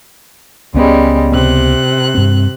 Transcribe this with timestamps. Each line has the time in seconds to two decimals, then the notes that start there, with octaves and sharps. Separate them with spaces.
0.75 C#2 C#3 G3 G#3 B3
1.31 C3 F#6
2.15 G2 C4